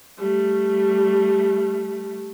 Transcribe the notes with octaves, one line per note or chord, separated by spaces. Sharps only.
G3 A3